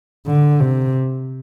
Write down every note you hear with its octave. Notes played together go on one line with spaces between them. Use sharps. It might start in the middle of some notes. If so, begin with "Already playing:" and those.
D3
C3